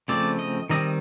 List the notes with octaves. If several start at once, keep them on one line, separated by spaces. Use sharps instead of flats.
C#3 F3 A3 C4 D5
D#5
D#3 G3 C4 D#5